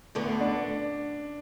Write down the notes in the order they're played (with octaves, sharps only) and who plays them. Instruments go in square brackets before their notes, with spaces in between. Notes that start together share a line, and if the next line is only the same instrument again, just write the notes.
[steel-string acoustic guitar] D2 D3 B3
[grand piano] D4